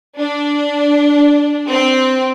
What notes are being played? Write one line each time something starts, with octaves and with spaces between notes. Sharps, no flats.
D4
C4